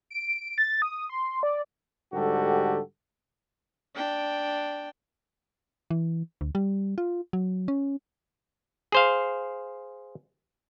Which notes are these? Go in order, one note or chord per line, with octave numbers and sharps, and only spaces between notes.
D7
A6
D#6
C6
D5
G#2 D3 G3 F#4 G4 A4
D4 G5
E3
D2
G3
F4
F#3
C#4
G#4 C5 F5